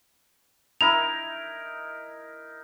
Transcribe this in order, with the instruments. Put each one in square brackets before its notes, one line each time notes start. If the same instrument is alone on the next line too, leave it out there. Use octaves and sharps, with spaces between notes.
[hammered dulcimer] D#4 E4 A#4 [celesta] F7